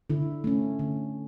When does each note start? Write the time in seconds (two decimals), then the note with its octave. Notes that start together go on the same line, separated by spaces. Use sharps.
0.10 D3 E4
0.44 A3 C#4
0.79 D3